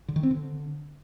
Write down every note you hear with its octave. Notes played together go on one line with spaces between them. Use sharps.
D3
D#3
C4
D3